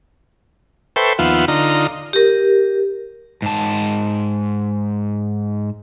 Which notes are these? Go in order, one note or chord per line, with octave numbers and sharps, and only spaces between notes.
A4 B4 C5 E5 G5 C#6
D#2 F3 B3 F4 E5 F#5
D3 D#4 F4 A#5
G4 A#4
G#2 A5